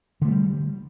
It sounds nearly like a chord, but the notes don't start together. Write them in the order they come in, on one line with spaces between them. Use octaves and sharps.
D3 A3 F#3 G3